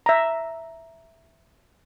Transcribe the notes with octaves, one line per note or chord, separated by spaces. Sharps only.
E5 A#5